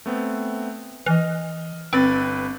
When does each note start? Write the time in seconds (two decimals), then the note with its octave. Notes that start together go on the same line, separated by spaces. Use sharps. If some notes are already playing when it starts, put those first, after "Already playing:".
0.06 A3 B3 C4
1.06 E3 D#5 F6
1.93 G1 C4 B4 A6